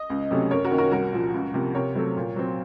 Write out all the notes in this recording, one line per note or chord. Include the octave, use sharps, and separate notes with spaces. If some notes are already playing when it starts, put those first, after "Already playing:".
Already playing: D#5
C#2
C3 F#3 A3 C#4
F#2 A#4 C#5
F#4 A#4
D#3 A#3 C#4
F#4 A#4
C2 F#4 A#4
A#2 F3
C#2
C3 F3 A#3
C3 A#4 C#5
F#3 A3 C4
A#2
F#3 C4